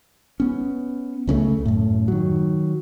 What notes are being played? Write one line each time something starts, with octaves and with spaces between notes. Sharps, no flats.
B3 C#4
C#2 C#3 E3 A3
F#2 A2
D#3 F#3